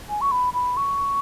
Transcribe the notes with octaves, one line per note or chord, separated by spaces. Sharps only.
G#5
C#6
B5
B5
C#6